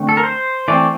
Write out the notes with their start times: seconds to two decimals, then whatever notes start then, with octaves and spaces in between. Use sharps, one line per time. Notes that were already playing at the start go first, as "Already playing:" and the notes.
Already playing: D3 A3 C4
0.09 A4
0.17 A#4
0.23 C5
0.68 E3 A3 C4 D5